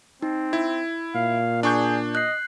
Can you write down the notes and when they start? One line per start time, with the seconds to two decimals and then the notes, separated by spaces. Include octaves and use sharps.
0.22 C4 D#4
0.53 E4 G#6
1.15 A#2 F5
1.63 D4 G#4 C#6 G6
2.15 D#5 F#6 C7